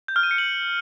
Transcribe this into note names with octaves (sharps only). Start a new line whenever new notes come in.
G6
F6
D#7
C#7
F#7